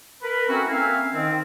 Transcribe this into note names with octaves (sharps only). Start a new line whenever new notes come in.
A#4 B4
A3 C4 C#4 E4 F#4 A#4
A#3 C4 C#4 E5 F5 G#5
D#3 C4